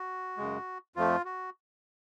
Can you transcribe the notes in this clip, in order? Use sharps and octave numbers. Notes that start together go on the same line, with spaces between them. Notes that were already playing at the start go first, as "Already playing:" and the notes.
Already playing: F#4
F#2 C#3 G#3
F2 F3 A3 F4
F#4